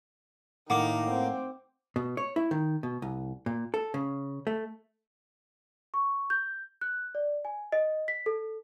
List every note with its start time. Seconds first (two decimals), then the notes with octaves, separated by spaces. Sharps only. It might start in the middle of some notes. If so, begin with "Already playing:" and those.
0.70 A2 D#3 A#3 F#5 D6
1.11 C4
1.96 B2
2.17 C#5
2.36 E4
2.51 D#3
2.83 B2
3.02 C2
3.46 A#2
3.74 A4
3.94 C#3
4.47 A3
5.94 C#6
6.30 G6
6.81 F#6
7.15 D5
7.45 G#5
7.72 D#5
8.08 B6
8.26 A4